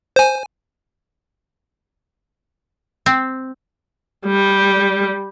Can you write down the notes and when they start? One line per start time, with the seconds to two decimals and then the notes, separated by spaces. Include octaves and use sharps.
0.16 C5 G#5
3.06 C4
4.27 G3